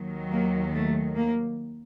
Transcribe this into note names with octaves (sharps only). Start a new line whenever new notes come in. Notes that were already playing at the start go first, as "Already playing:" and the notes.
Already playing: D#2 D#3 F#3
A#3
A3
A#3